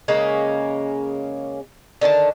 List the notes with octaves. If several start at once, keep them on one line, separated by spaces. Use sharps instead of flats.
C#3 G#3 A#3 C#4
D3 D#3 D4 A5